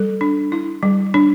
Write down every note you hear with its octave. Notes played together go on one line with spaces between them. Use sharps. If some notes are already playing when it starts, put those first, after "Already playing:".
Already playing: G3 A4
D4
E4
G3
D4